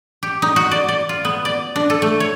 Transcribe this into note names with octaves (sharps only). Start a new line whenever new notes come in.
G4
D#4
F#4
D5
D5
F4
B3
D5
D4
A4
A3
C#5